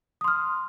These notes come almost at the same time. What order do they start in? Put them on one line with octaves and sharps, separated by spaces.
D#6 C6 F6